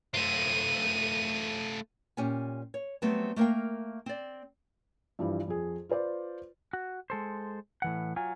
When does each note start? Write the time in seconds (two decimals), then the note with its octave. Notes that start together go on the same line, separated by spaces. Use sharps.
0.14 A3 F4 D#7
2.17 A#2 C#4 G4 G#5
2.74 C#5
3.02 F#3 G3 A3 B3 C4
3.36 A3 A#3 A#4 F5 G5
4.06 C4 D5
5.19 G2 E3 F3 G3
5.48 F2 G#4
5.89 F4 B4 C5 D5
6.73 F#4
7.10 G#3 A4 C5
7.82 A2 E3 F#5
8.16 F#3 F4 G#5